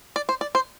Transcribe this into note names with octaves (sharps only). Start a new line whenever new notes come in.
D5
C5
D5
C5